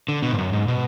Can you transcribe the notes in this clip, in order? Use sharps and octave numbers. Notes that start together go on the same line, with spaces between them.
D3
B2
G#2
F#2
G#2
B2